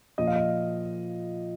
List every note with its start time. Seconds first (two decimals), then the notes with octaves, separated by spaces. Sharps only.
0.18 A#2 F3 D#5
0.27 F5
0.36 D#5